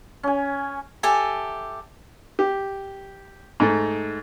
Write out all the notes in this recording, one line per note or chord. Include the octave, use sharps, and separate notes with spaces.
C#4 G#5
G4 A4 E5 G#5
G4
G#2 A3